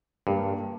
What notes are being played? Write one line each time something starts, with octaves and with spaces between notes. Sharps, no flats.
G2 G3 A#3 D4 G4 A#4